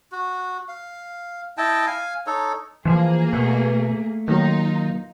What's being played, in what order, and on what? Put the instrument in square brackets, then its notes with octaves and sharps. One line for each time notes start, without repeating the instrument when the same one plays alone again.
[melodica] F#4
F5
E4 D#5 G5 A5
F5 G#5
D#4 A4 C#5
[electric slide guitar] E3 E5 G#5 [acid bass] F3 [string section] A#3 G#4
[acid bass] B2 [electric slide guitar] A3
[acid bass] D#3 [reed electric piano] F#3 A#3 [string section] D#4 F4